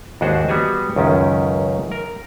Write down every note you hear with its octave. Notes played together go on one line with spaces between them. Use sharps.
D#2 G#2 D4 F#4 G#4 C5
G3 B3 F#4 G#4 G#5
C#2 F#2 D#3 C#4
A#4